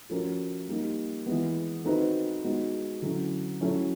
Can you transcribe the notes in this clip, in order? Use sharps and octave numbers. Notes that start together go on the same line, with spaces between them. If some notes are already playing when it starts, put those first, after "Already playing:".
F3 A3 C#4 F#4 A#4
G3 A#3 D#4
E3 G#3 B3
A3 C4 D#4 F#4 B4
G#3 B3 D#4 F#4
D3 F#3 A3 C#4 E4
F#3 A3 C#4 E4